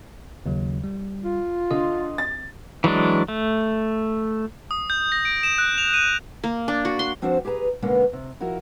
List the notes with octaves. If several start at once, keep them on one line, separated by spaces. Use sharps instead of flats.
D#2 C#3 F#3
G3
F4
D3 D#5 C6 D#6
A6
E3 F#3 G#3 D4
A3
D#6
G6
A#6
D7
E7
F#6
F7
D#7
A#3
D4
F#4
C6
F3 C4 D4 F#4 C5
G4 G#4 B4 A5 A#5
B2 D3 G#3 A#3 B3 C#4
C3
F3 E4 F#4 A#4